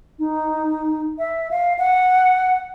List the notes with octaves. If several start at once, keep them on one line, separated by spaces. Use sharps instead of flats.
D#4
E5
F5
F#5